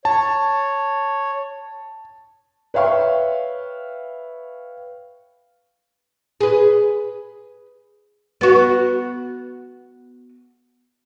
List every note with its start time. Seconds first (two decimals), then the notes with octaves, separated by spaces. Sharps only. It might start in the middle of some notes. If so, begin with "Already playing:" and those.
0.05 C#5 A5
2.74 B4 C#5 E5 F5 G5 C#6
6.40 G#4 B4
8.41 B3 F#4